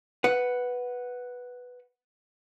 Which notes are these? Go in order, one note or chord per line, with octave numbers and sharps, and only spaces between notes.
B4 F#5